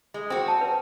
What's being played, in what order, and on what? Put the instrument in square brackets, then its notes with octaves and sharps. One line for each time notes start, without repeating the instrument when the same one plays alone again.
[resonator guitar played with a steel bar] G#3
[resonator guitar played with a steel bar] C4 F#4 [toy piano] C6
[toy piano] A5
B4